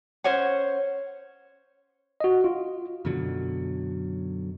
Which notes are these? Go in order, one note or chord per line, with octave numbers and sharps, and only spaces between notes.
C#4 C5 C#5 F#5
F#4 D#5
F4
F#2 B2 D3 F#3